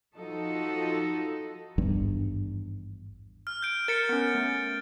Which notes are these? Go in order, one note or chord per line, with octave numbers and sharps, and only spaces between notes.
F3 D#4 F#4 A4
G#1 E2 G2
F6
G6 D7
A#4 A6 C#7
B3 C#4
A3